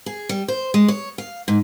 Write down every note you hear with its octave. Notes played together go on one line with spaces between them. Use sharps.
G#4
G3
C5
G#3
C#5
F5
G#2